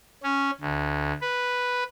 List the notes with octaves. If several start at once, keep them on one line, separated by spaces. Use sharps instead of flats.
C#4
D2
B4